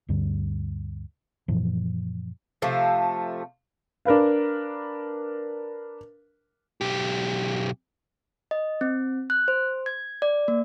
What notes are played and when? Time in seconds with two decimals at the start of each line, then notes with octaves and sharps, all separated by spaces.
0.08 D2 G2 D3 G3
1.48 F#2 A#2 E3 F3
2.62 C3 F3 A3
4.05 D4 A#4 B4 F5
6.81 B1 G4
8.51 D#5
8.81 C4
9.30 F#6
9.48 C5
9.86 G#6
10.22 D5
10.48 A#3